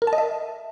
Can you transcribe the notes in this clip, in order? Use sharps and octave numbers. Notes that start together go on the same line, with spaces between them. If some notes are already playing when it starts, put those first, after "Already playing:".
A#4
A5
D#5
E5